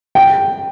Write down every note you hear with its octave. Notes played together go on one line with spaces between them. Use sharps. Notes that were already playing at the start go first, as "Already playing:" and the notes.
G5